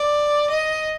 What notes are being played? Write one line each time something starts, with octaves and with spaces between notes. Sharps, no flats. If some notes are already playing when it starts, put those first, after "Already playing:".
Already playing: D5
D#5